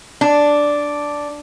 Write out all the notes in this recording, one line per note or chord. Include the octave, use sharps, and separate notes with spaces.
D4